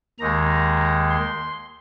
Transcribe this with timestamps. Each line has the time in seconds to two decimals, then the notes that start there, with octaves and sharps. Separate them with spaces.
0.19 D#2 D#3 G#3 A#5
1.10 C6